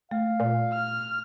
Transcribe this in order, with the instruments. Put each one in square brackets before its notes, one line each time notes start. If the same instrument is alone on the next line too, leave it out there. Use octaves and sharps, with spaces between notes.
[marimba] A3 [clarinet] F5
[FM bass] A#2
[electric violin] F6